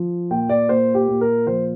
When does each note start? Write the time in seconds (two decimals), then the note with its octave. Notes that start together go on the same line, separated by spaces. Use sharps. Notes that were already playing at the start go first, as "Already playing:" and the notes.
Already playing: F3
0.31 A#2 G5
0.49 D5
0.69 A#2 C5
0.94 G4
1.08 A#2
1.21 A#4
1.47 F3 C5